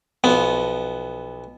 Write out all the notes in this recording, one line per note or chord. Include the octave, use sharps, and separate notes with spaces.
B1 F3 B3